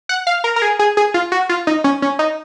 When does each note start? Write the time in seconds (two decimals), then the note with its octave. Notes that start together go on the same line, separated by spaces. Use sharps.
0.09 F#5
0.27 F5
0.44 A#4
0.56 A#4
0.62 G#4
0.79 G#4
0.97 G#4
1.14 F4
1.32 F#4
1.49 F4
1.67 D#4
1.84 C#4
2.02 C#4
2.19 D#4